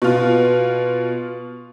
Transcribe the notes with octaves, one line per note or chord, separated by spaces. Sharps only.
B2 F4